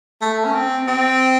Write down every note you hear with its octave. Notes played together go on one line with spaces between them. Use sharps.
A3
C#4
C4
C4